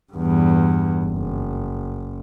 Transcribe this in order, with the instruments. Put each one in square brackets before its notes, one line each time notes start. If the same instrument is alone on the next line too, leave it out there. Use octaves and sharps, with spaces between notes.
[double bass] E2 G2
F#1